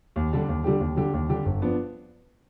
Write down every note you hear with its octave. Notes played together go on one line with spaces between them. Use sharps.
D#2
D3 G3 D4 G4
D#2
D3 G3 D4 G4
D#2
D3 G3 D4 G4
D#2
D3 G3 D4 G4
G1
F3 B3 D4